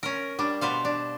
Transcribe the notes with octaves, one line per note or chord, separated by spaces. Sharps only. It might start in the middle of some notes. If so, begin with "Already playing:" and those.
C#4 A#4
G3 D4
B2 B4 C5 F5
D4